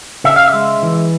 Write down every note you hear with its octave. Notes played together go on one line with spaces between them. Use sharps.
C#3 E5
F5
E5
G#3
E3